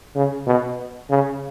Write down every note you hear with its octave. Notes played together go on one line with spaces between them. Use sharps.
C#3
B2
C#3